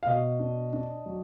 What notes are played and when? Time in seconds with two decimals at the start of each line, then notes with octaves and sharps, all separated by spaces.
0.03 F5
0.06 B2 D#5
0.39 D4
0.73 D4
1.06 F#3